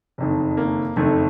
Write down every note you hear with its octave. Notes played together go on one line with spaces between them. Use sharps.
F#1 F2 D#3
A#3
F#1 F2 D#3 A3